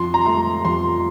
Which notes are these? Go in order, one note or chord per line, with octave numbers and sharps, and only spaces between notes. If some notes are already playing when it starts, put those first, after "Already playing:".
Already playing: F2 C6
A#5
A3 C6
F2 C6